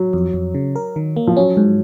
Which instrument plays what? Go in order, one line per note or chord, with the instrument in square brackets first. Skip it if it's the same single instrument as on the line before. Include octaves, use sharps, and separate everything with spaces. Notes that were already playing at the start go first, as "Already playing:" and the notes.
Already playing: [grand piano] F#3
[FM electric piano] F2
F2
C#3
A#4
D#3
A#3
[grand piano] F3
[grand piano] F#3 [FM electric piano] C#4
[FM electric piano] G#2